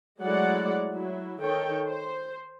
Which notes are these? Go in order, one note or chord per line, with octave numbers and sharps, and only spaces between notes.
F#3 G#3 A3 E4 D5 F#5
F#3 E4
D#3 A4 C#5 G5
C5